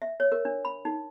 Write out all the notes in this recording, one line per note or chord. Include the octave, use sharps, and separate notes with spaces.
E5
C#5
A#4
D4
B5
D#4